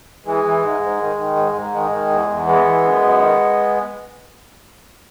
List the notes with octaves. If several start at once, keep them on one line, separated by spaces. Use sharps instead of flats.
E3 G#3
E3
G#2
G#2
D#3
D#3
G#2
G#2
D#3 G#3
D#3
E2
E2
E3 G#3 B3
E3
F#2
F#2
D#3